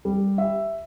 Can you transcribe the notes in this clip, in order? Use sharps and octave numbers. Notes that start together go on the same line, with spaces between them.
G3
E5